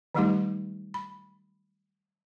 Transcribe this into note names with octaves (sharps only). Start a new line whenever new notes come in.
D#3 F#3 G3 A3 D#4 G4
B5